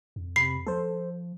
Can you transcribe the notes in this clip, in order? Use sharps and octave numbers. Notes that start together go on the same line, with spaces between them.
F2
C3 B5 C7
F3 A4 C5